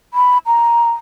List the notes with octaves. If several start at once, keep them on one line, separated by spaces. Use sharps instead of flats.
B5
A#5